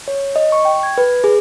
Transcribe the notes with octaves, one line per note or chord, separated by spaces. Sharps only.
C#5
D#5
C#6
G5
G#6
B4
G#4